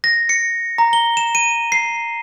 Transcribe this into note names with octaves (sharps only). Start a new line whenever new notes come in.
A#6
C#7
A#5
G7
E7
D#7
C7